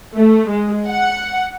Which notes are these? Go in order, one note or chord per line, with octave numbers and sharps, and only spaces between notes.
A3
G#3
F#5